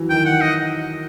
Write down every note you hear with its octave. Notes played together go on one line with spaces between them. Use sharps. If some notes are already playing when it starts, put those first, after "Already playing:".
Already playing: E3 F#3
D#3 G5
F#5
D#5